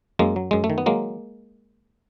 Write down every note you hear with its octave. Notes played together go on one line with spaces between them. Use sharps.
F#2 G#3 A#3
F#3
F#2 G#3
A3
D#3
B3
F#3 G#3 A#3